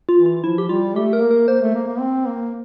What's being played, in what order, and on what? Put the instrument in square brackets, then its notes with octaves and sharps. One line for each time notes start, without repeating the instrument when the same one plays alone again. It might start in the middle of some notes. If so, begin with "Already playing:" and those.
[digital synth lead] F4
[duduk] E3
[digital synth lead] F4
[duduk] F3 [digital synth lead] E4
[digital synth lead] G4
[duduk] G3 [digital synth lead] F4
[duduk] A3 [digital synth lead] G4
[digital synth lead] A#4
[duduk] A#3
[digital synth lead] A#4
[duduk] A#3 [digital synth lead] C5
[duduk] A3
A#3
A#3
C4
A#3